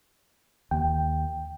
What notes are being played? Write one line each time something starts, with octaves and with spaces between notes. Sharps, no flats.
D#2 G5